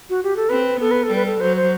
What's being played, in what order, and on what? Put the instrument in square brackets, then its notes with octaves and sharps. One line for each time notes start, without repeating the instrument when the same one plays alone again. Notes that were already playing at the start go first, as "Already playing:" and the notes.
[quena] F#4
G4
A4
[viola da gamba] C4 [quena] B4
[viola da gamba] B3 [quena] A4
[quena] B4
A4
[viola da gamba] G3 [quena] B4
[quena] A4
[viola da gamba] F#3 [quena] C5
[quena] C5